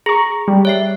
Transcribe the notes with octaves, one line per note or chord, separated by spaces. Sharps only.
G#4 A#5 C#6
G3
C#5 E5 C7